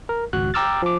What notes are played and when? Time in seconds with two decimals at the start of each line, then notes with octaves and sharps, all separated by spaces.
0.09 A#4
0.33 G#1 C#2 F#4 F#6
0.54 G5 A#5 D6 E6 F6 A6
0.82 F3 D6